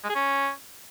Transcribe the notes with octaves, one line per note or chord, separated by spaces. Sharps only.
G#3
G#4
C#4